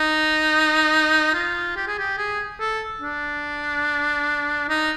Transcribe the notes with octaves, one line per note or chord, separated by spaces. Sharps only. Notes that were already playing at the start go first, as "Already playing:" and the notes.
Already playing: D#4
F4
G4
G#4
G4
G#4
A4
D4
D#4